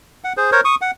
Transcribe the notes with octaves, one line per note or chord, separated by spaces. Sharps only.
F#5
G#4 C5
A#4 C5 C#5
C#6 D#6
F#5